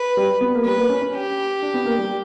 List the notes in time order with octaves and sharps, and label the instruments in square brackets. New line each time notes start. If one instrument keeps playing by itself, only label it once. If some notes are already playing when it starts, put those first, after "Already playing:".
Already playing: [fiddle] B4
[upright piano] G3
B3
A#3
[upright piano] G3 [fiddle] B4
[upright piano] A#3
C#4
C#4
[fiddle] G4
[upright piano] D4
B3
A#3
G3